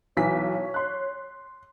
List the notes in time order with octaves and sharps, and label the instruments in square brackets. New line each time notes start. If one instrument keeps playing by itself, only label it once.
[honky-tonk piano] B1 E3 B6 [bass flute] C#5
[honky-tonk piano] C6 F#6